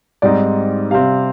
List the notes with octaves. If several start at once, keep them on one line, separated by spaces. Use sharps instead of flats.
G#2 G3 C4 D#4 D5
C3 G3 C4 F5